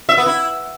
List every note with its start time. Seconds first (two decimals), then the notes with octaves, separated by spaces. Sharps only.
0.09 E5
0.17 B3
0.26 E4